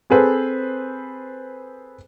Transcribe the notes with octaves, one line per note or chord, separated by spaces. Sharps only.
C4 G#4 A4 B4 C5